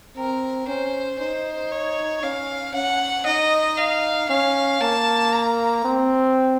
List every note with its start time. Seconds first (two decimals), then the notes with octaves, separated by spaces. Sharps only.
0.16 C4 A#4
0.68 C#4 C5
1.19 D#4 C5
1.72 C#5
2.23 C#4 F5
2.74 C#4 F#5
3.26 D#4 D#5
3.77 F5
4.29 C#4 F5
4.81 A#3 A5
5.32 A#5
5.84 C4